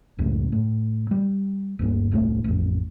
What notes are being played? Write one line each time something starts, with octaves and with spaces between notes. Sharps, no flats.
C#2 F#2 A2
A2
G3
G1 D2 G2 A#3
D#1 C2 A2 A3
A1 F2